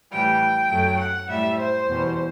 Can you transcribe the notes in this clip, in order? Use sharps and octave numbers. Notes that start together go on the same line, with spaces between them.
A2 E3 G3 G5
F#2 F#3 A3
F#5
A2 G3 E5
C5
E2 B2 G3